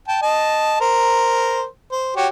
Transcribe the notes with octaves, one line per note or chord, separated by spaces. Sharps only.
G5 A5
D#5 A5
A#4 C5
C5
F#4 G4 C#5